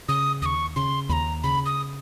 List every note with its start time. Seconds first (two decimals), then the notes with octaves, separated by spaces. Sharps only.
0.09 C#3 D#6
0.42 D#2 D#6
0.46 C#6
0.76 C#3 C6
1.09 D#2 B5
1.13 A#5
1.43 C#3 B5
1.66 D#6